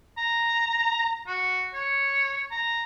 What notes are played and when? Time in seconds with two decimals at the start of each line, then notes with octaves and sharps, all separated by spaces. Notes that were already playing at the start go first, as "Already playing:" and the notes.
0.17 A#5
1.27 F#4
1.74 C#5
2.51 A#5